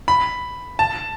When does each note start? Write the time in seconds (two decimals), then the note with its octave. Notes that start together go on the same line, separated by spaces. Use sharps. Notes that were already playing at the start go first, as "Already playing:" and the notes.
0.08 B5
0.79 A5